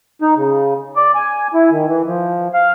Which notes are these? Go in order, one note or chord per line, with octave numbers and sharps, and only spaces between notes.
D#4
C#3
D5
G#5
E4
D#3
E3
F3
F5